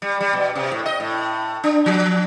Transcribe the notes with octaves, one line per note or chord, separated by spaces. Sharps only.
G3
G3
B2
C3
A2
D#5
A2
D4
F3